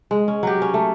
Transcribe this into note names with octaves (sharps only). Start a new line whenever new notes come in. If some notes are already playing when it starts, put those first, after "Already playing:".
G#3
C#4
F#3 G4
C#4
A3